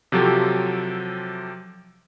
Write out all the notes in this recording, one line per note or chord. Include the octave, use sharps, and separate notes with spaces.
C3 F3 F#3 G4 A4